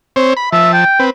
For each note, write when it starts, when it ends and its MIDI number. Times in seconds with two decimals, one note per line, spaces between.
0.16 0.34 60
0.16 0.34 72
0.16 0.34 73
0.37 0.49 83
0.52 0.84 53
0.52 0.72 76
0.52 0.84 81
0.73 1.02 79
1.00 1.10 60
1.00 1.10 71